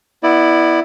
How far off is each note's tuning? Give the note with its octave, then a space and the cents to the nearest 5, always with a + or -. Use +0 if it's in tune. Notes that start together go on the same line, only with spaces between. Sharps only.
B3 +0 E4 +0 D5 +20